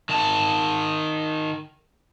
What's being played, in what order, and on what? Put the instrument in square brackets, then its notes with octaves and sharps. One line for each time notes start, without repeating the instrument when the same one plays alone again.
[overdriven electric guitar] D#3 A5